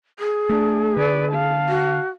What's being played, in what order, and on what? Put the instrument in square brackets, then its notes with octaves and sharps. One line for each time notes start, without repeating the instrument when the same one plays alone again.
[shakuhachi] G#4
[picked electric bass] A3 [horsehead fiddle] D4
[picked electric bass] D3 [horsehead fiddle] B4 D5
[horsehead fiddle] F5 A5
[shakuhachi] F#4